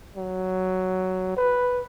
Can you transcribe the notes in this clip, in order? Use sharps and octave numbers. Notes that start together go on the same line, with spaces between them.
F#3
B4